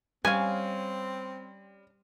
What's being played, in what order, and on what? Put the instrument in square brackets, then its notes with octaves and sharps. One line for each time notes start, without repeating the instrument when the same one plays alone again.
[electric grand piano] G3 [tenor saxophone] C4 [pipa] C#4 F5 [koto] G#5